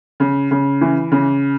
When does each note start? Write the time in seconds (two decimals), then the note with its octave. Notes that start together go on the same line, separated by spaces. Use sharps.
0.20 C#3
0.51 C#3
0.81 E3
1.12 C#3